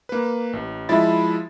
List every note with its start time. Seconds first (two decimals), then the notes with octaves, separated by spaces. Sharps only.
0.09 A#3 B4
0.53 A1
0.89 F3 G#3 E4 E5 B5 A6